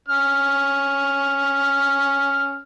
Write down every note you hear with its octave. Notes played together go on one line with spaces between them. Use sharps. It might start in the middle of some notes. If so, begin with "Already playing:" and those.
C#4 F6